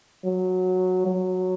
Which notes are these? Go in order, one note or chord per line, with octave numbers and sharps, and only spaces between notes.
F#3
F#3